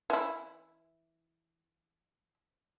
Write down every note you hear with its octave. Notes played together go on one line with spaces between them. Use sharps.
E3 E4